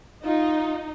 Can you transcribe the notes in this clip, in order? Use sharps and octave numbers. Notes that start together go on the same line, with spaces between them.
D#4 F4